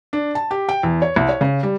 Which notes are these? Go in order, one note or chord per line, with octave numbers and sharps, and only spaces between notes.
D4
A5
G4
G5
E2
C#5
C2
C#5
C#3
G3